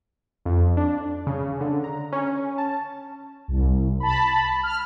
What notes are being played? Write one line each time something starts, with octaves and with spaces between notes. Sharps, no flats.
F2
D4
C#3
D3
A#5
C#4
A5
C2
A5 B5
F6